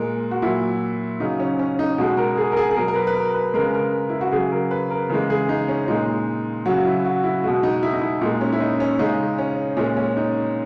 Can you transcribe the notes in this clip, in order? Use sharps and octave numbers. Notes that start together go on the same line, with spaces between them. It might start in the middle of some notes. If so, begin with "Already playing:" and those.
Already playing: A#2 G#3 A#4
F#4
A#2 F#3 E4
C#3 F#3 D#4
C#4
C#4
D#4
B2 G#3 F#4
A#4
G#4
A#4
G#4
G#4
B2 F#3 A#4
A#4
B4
B4
A#4
B4
C#3 G#3 A#4
B4
A#4
E4
F#4
C#3 F#3 G#4
A#4
B4
A#4
C#3 E3 G#3
G#4
D#4
C#4
A#2 G#3 D#4
C#3 F#3 F#4
E4
F#4
E4
B2 G#3 F#4
D#4
E4
D#4
E4
A#2 G#3 D#4
C#4
E4
D#4
C#4
C#3 G#3 D#4
C#4
A#2 G#3 C#4
C#4
D#4